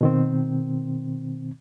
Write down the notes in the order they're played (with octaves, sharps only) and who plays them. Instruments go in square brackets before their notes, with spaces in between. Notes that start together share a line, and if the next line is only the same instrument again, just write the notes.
[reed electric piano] B2 D#3 C4